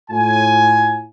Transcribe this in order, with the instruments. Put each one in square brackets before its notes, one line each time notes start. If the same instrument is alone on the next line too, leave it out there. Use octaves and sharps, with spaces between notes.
[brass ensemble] A2 F4 G#5